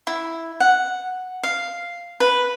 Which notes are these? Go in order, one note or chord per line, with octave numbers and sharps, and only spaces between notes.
E4
F#5
F5
B4